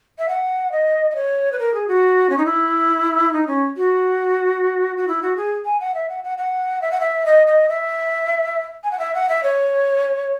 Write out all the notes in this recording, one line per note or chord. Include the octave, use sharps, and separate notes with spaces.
E5
F#5
D#5
D#5
C#5
B4
A#4
G#4
F#4
C#4
D#4
E4
D#4
C#4
F#4
F#4
E4
F#4
G#4
G#5
F#5
E5
F#5
F#5
F#5
E5
F#5
E5
D#5
D#5
E5
G#5
F#5
E5
F#5
E5
C#5